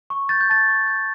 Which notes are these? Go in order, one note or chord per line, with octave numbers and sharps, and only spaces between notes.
C#6
G6 A6
G6
A5 A6
C#6
G6